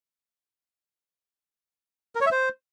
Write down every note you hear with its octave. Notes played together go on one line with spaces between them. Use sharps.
A#4
C#5
E5
C5